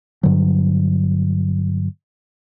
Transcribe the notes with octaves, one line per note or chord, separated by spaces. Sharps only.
G2 D3 F#3